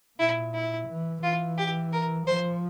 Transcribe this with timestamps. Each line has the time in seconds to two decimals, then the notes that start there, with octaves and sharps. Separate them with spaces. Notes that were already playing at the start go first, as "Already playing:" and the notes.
0.19 A#2 E4
0.54 E4
0.89 E3
1.23 E3 F4
1.58 G4
1.93 A#4
2.27 F3 C5